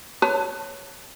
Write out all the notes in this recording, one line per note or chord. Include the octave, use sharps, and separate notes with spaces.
B4 C#5 A5